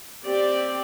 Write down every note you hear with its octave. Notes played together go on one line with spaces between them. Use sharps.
C4 G4 D5